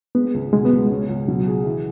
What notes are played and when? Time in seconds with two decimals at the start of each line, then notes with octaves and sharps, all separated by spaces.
0.15 G#3 B3
0.34 C#2
0.53 B2 G#3
0.65 B3
0.71 C#2
0.77 G#3
0.90 C#4
1.09 C#2
1.28 B2 F#3
1.46 G#4
1.66 E3